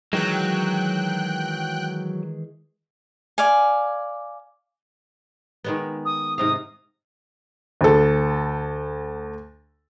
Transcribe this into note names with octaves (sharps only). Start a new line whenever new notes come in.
D#3 E3 F#3 G#3 G5 F#6
D5 F5 G#5
D#3 G#3 B3
D#6
G#2 C3 F5 D#6
D2 A4